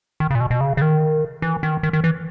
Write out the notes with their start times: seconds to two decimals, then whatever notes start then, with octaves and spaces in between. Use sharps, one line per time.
0.20 D#3
0.30 C#3
0.35 A#2
0.41 B2
0.51 B2
0.61 C#3
0.77 C#3
0.82 D#3
1.42 E3
1.63 D#3
1.83 D#3
1.93 D#3
2.04 E3